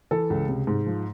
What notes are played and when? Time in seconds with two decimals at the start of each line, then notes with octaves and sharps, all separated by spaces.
0.11 E3 A4
0.30 C#2
0.49 C3
0.67 G#2
0.86 F3